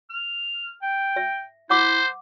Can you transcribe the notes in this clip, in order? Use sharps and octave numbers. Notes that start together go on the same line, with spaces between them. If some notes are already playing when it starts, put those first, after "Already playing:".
F6
G5
E5
E4 C5 F#5 D6